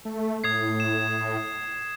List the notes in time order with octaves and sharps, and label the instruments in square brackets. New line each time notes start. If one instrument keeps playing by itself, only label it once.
[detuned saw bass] A3
[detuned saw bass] A2 [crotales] D#6 G#6 C7
[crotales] E7